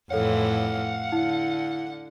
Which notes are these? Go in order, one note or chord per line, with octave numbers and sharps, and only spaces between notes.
F2 A2 E3 A4 C#5 F5 F#5
D3 E4